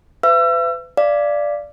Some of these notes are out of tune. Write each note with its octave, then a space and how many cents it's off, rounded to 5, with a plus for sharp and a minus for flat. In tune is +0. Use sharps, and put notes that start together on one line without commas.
B4 +35 E5 +35 E6 +35
D5 +0 F5 -25